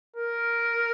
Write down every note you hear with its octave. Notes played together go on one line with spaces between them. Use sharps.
A#4